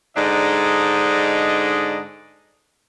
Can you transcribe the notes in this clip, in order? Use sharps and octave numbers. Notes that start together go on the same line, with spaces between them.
G#2 D3 D4 D#4 D#5